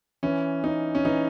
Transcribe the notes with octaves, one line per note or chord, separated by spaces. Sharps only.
E3 C#4
C#4 D#4
C#4
E3 D#4